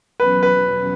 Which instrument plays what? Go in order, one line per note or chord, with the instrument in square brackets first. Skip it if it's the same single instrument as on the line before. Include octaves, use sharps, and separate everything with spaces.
[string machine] E2 B2 F#3 C#4 [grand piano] B4
[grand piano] B4